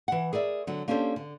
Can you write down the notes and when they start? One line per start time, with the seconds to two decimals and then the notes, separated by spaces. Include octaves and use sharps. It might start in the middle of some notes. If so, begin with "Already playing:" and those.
0.08 E3 F#5
0.33 G#4 A#4 D5 E5
0.67 D3 F#3
0.88 A#3 C#4 D4 G4 A4 C5
1.16 D3